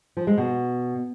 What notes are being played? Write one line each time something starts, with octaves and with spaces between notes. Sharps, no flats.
F3
G#3
B2